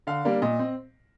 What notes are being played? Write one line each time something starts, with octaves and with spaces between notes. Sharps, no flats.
D3 F5
G3 A#3 D4
A#2 D#5
C4